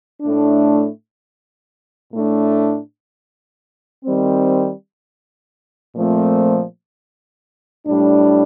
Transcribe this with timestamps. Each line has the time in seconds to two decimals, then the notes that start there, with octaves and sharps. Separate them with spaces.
0.22 A2 A3 D4
2.12 A2 A3 D4
4.04 D#3 G3 C4
5.95 A#2 F3 A3 C4
7.86 A2 G3 D4